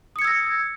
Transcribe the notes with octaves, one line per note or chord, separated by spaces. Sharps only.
D#6 E6 G#6 A#6 C#7